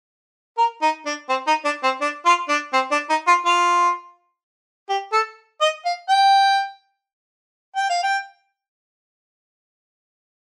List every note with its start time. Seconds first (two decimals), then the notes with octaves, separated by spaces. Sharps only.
0.58 A#4
0.82 D#4
1.06 D4
1.29 C4
1.47 D#4
1.65 D4
1.83 C4
2.01 D4
2.25 F4
2.49 D4
2.73 C4
2.91 D4
3.10 D#4
3.27 F4
3.45 F4
4.89 G4
5.13 A4
5.61 D#5
5.85 F5
6.09 G5
7.77 G5
7.90 F5
8.03 G5